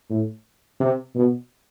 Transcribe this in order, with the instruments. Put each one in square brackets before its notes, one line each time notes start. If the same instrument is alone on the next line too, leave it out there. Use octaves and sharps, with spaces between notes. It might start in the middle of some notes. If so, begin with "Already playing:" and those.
[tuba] A2
C3
B2